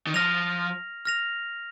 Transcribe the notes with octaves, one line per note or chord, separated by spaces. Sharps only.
D#3
F3 F6 A#6 F7
F6 A#6 F7